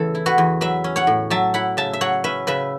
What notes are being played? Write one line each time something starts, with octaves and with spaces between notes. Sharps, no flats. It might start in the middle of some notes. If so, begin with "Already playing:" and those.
Already playing: E2 C#3 E3 A3 A4
E4
F#4 B4
E2
F#3 B4 E5
C#4
C#5 F#5
A2
F#3 E5 A5
E4 F#5 B5
C#3 E5 A5
E5
F#3 C#5 F#5
C#4 B4 E5
C#3 B4 E5